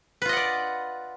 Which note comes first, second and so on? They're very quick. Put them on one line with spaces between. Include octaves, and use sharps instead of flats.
B4 F4 D#5 F#5 D5